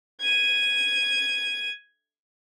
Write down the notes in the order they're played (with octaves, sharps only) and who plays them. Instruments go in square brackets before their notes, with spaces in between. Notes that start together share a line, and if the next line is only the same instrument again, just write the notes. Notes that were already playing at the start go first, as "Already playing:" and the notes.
[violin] G#6 D#7